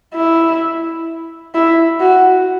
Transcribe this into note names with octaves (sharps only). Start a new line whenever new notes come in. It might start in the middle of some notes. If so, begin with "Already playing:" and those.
E4
E4
F#4